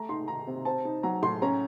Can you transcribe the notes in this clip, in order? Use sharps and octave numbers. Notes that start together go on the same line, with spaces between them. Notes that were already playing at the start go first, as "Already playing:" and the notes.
Already playing: A3 A#5
D#4 C6
D#3 A#5
C3
C4 A5
D#4
F#3 A#5
A2 C6
C#4 A#5